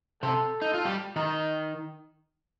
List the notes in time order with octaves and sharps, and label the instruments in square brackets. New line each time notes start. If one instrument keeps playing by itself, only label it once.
[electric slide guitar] C3 C4 [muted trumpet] A4
[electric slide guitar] D#4
F4
G3 G4
D#3 D#4